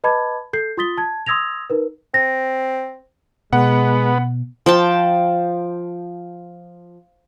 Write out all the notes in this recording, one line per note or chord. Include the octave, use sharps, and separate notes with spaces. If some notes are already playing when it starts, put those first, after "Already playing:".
B4 D#5 A5 B5 D6 G#6
A4 G6 C7
F4 C6 D#6 A6 B6 G7
A5 G#6
C6 D#6 E6 G#6 A#6 F7
D#4 A#4 B4
C4 A#6
B2 G#3 B3 F#5
F3 G5 A5